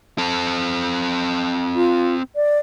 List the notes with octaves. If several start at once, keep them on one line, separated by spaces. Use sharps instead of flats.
C4 A4
F4
D5